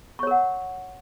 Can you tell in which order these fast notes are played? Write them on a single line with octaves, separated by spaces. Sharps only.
C#6 C#5 A#4 F#5